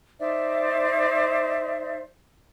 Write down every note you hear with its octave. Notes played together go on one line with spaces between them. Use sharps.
D#4 C5 D5 E5